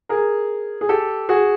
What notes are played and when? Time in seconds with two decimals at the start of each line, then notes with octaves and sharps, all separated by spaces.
0.09 G#4 A#4
0.81 G#4
0.89 G4 A4
1.29 F#4 G#4